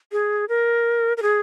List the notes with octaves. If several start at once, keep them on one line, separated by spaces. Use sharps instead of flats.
G#4
A#4
A#4
G#4